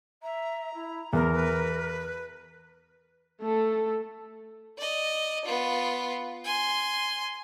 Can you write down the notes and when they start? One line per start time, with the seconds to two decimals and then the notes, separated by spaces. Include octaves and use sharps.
0.23 E5 A#5
0.74 E4
1.13 E2 A#4
1.33 B4
3.41 A3 A4
4.78 D5 D#5
5.45 B3 F4
6.45 G#5 C6